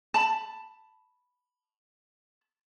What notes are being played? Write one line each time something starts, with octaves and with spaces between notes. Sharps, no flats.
A5 B5